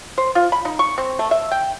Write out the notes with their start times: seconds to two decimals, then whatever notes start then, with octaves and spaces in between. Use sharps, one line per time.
0.18 C5
0.35 F4
0.52 B5
0.65 D#4
0.79 C#6
0.98 C4
1.19 A3
1.31 E5
1.51 G5